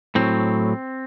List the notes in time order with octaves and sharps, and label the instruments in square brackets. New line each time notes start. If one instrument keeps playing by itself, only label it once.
[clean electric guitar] A2 F#3 C4